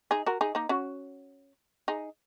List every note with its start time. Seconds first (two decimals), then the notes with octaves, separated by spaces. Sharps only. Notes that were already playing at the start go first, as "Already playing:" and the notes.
0.11 D#4 G#4
0.26 F#4 A#4
0.41 D#4 G#4
0.55 A#3 D#4
0.69 C#4 F#4
1.88 D#4 G#4